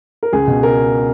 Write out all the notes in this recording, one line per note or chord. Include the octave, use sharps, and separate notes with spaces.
A#4
C#2 G#4
B2
A#4